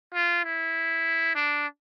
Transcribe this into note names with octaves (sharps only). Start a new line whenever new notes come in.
F4
E4
D4